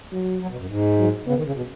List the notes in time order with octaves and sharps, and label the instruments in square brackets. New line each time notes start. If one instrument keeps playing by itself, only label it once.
[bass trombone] F#3
[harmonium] F#3
B2
F#2
G#2
[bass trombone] F#3
[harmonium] C#3 [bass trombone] B3
[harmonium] D#3
C#3
B2